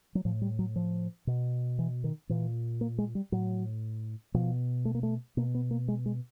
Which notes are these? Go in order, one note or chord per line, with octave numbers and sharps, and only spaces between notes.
F#3
A2 F3
G3
F#3
F3
B2
E3
D#3
A#2 E3
A#3
G#3
G3
A2 F#3
B2 F3
A3
A#3
A3
B2 A#3
B3
A#3
G#3
G#3